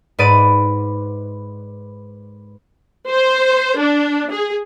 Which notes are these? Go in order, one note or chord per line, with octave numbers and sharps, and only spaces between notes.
G#2 B4 D5 D6 A6 D#7
C5
D4
G#4